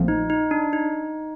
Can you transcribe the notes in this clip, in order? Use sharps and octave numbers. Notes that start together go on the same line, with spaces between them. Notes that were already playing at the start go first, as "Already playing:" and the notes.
Already playing: A#1 A#2 F3 A3 C4
D#4
D#4
D4
D#4